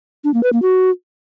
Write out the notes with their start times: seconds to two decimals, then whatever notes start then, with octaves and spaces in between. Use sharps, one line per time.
0.24 D4
0.34 A#3
0.43 B4
0.53 A#3
0.62 F#4